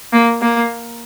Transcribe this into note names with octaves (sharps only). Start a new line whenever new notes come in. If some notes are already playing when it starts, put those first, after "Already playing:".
A#3
A#3